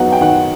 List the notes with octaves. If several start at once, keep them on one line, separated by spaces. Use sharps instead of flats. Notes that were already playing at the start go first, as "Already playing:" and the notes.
Already playing: F#3 B3 D#4 F#5
G5
D#3 F#5